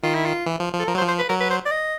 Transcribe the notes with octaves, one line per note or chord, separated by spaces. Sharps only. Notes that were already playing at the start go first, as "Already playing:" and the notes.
D#3 F4
E4
F4
E3
F3
F3
A4
F3 A#4
F#3
C5
F3
C5
B4
F#3 A#4
B4
C5
D5
D#5